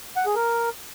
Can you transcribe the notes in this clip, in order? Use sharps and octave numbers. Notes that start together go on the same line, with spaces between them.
F#5
G#4
A#4